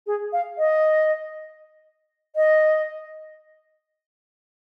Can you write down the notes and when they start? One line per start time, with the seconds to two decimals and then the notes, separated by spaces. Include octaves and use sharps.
0.07 G#4
0.33 F5
0.58 D#5
2.36 D#5